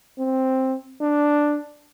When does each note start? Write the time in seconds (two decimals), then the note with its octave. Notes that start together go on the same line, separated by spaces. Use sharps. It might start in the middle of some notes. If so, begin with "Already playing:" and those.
0.19 C4
1.01 D4